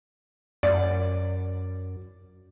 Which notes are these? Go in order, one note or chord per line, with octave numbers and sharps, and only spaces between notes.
F#2 D5